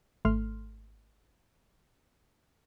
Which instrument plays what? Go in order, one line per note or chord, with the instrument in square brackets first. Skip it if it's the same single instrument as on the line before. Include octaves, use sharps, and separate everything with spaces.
[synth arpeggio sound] G#1 A3 C6 F6